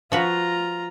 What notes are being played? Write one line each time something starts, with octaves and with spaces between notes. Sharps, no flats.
F3 F4 F#4 B4 A#5